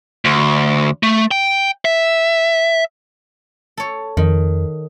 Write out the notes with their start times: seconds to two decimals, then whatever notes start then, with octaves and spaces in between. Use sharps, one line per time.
0.25 D2
1.03 A3
1.31 G5
1.85 E5
3.77 A4 C#5
4.17 F2 D#3